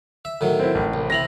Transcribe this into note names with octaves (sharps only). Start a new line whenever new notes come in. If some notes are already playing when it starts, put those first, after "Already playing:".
E5
A2 D#3 F#3
C4 E4
A1
C2
C3 E4 A#6 F7 F#7